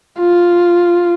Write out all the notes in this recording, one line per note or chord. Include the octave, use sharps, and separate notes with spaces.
F4